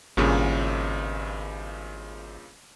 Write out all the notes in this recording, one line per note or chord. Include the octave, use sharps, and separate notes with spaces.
G#1 G2 A#2 C#3